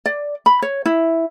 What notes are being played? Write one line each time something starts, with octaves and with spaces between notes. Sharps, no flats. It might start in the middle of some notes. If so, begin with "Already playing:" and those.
D5
B5
C#5
E4